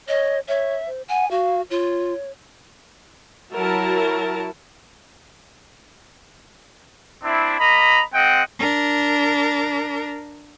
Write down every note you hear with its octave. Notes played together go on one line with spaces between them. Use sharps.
C#5 D#5
C#5 E5
C5
F#5 G#5
F#4 F5
F4 C#5
F#3 E4 F#4 A#4 A5
C4 D4 E4
A#3 D#5 A#5 B5
G#3 C4 D#5 F#5 G5
D4 A#4